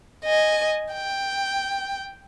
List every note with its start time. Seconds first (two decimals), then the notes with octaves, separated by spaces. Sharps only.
0.25 D#5 G#5
0.92 G5